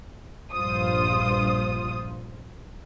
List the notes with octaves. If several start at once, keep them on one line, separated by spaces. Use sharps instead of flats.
A#1 G2 F4 C5 D#6